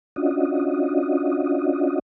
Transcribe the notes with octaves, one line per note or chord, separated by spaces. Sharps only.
C#4 D4 F4 F#4 D#5